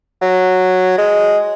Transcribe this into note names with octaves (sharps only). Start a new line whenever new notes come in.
F#3
G#3